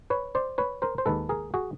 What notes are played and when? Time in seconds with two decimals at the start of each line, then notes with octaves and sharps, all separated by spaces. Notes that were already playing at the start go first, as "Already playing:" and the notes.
0.10 B4 C#5
0.35 C5 D5
0.58 B4 C#5
0.82 A#4 C5
0.98 C5
1.06 D#2 D#3 G#3 A4 B4
1.29 G#4 A#4
1.54 F#4 G#4